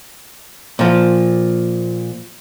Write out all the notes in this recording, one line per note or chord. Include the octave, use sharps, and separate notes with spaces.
A#2 F3